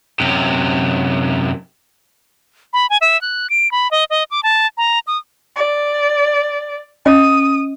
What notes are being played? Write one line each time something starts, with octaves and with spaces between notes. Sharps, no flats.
F#2 C3
B5
G#5
E5
F#6
D7
B5
D#5
D#5
D6
A5
A#5
D#6
D5
C#4 D#5 D#6